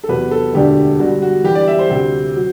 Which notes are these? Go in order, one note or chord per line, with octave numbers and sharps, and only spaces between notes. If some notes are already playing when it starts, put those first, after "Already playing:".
A4
E2 C3 F#3 B4
A4
E1 D2 D3 A3 D4 G4
G2 D3 G3 F#4
F#4
G2 E3 G3 G4
D5
E5
C5
D2 C3 G3 C4
F#3